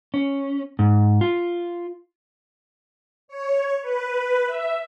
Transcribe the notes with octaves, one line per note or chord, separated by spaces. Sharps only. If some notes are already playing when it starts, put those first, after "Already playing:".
C#4
G#2
F4
C#5
B4
E5